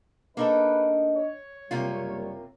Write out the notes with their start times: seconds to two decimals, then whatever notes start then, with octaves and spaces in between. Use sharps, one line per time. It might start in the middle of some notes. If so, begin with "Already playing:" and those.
0.37 A#3 D4 D#4 A4 B4 D#5
1.16 C#5
1.71 F#1 C3 G3 A#3 F4